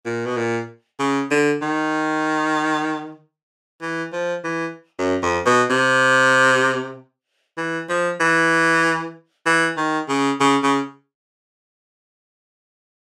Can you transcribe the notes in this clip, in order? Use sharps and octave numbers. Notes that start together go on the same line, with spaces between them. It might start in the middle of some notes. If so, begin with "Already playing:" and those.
A#2
B2
A#2
C#3
D3
D#3
E3
F3
E3
F#2
F2
B2
C3
E3
F3
E3
E3
D#3
C#3
C#3
C#3